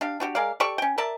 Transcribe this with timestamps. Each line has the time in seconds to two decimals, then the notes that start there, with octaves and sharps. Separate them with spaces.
0.01 D4 G4 F5
0.20 D4 F#4 G4
0.35 G#3 A#4 D5 F5
0.60 G4 A4 D5 C#6
0.78 C#4 G5
0.98 A#4 D5 E5 A5